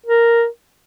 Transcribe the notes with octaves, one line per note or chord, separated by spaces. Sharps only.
A#4